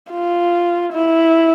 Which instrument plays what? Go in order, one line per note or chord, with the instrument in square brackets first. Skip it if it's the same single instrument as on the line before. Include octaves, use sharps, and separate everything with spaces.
[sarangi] F4
E4